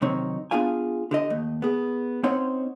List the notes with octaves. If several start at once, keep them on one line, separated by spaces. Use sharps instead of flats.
F#2 C3 D#3 C4 D#4 C#5
B3 D4 F4 G#4 F5 G#5
D3 G4 D#5
D#2 A3
B3 G#4
C4 C#4 D#4 C5 C#5 F#5